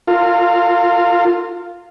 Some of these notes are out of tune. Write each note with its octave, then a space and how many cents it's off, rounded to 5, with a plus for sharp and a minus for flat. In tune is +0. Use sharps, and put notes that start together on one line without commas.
F4 +0 A#4 -40